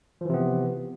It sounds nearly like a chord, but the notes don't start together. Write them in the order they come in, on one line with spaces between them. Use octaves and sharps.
F3 E3 C3 B3